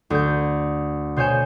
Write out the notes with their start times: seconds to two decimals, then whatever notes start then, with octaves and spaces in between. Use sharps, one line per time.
0.10 D2 G6
1.16 B2 C5 C#5 G#5 G6 E7